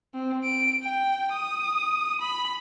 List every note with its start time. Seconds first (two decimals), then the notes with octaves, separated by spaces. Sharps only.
0.14 C4
0.44 D7
0.83 G5
1.33 D#6
2.21 B5